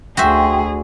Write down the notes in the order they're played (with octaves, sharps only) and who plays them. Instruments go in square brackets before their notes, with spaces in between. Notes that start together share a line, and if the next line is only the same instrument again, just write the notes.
[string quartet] D2 G#4 [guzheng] F#4 C5 E5 [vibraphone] G5